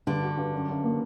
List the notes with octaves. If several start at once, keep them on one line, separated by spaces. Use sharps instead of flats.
G2 D3
F#4
G2
F#2
F#2
A#3